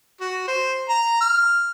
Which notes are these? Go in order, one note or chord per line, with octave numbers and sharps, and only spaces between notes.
F#4
C5
A#5
F6